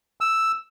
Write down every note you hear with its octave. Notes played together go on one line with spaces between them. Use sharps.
E6